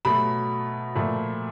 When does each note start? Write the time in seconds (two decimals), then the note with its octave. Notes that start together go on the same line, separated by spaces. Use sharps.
0.05 B2 F#3 A3 B5
0.95 A#2 F3 A3